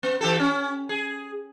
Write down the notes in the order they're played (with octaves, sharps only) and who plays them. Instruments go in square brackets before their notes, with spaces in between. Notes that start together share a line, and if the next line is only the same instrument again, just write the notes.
[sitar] B3
E3 G4 A4
C#4
G#4